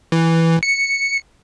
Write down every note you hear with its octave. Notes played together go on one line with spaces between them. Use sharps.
E3
C#7